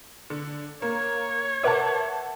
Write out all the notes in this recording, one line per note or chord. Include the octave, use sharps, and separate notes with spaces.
D3
A#3 C#5
A#4 B4 E5 F#5 A5 D6